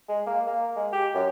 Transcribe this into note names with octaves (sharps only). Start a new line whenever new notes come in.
G#3
A#3
A#3
G#3
G4
F#2